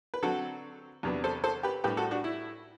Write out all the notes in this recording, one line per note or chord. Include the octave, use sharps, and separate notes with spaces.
B4
D3 F#3 C4 F#4 A4
E2 C3 F#3 B3 D4
A4 C5
A4 C5
G4 B4
A2 G3 D4 G4 B4
F#4 A4
D4 F#4
E4